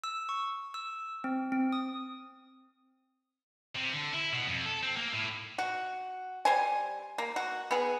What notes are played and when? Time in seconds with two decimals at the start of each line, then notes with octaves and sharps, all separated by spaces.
0.04 E6
0.29 C#6
0.74 E6
1.24 C4
1.52 C4
1.73 D#6
3.76 C3
3.93 D3
4.13 E4
4.33 B2
4.47 F2
4.66 A4
4.83 C4
4.97 A#3
5.13 A2
5.58 F#4
6.45 G3 C5 G#5
7.18 A#3
7.36 F#4
7.71 B3 G#4